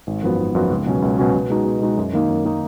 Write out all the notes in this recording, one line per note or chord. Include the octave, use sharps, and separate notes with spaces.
G#1
F#2 F3 B3 F#4
G#1
F#2 F3 B3 F#4
C#2
B2 F#3 C#4 F#4
C#2
B2 F#3 C#4 F#4
B2
G#3 D#4 F#4
B2
G#3 D#4 F#4
F#2
D#3 A#3 D#4
F#2
D#3 A#3 D#4